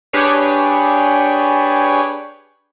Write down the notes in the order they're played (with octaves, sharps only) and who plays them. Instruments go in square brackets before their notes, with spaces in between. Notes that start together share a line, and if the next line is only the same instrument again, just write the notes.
[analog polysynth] D4 G4 G#4 B4 C#5